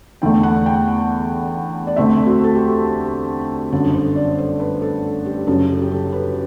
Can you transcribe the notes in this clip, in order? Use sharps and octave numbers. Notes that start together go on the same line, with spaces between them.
E2 D3 A3 G5
F#5
G5
F#5
D5
D2 D3 A3 C4 E5
F#4
A4
G4
G1 F#2 D3 A4
C5
D5
C5
B4
A4
G4
F#1 F#2 F#3 A4
G4
G4
A4
B4